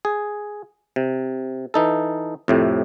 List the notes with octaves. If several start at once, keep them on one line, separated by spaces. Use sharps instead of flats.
G#4
C3
E3 D#4 A4
F2 A2 C3